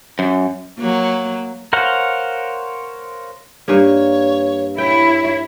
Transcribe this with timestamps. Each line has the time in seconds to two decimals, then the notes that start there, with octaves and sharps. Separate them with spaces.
0.19 F#2
0.78 F#3 A#3
1.73 A#4 C5 C#5 F5 F#5
3.68 G2 A#3 C#5
4.78 E4 C#5 G5